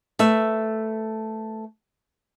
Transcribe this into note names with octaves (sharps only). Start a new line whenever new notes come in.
A3 B4 E5